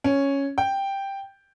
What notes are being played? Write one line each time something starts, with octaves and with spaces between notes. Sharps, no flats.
C#4
G5